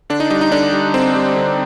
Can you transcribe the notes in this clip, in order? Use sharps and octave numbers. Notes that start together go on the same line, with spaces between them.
D3 D4
D#4
G3 D#4
D#4
D3 D4
G3
D3 C4
G3
D3